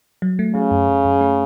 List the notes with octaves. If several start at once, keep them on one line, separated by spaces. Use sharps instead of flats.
F#3
A3
C#3 F#3
F#2
F#2
F#2
A3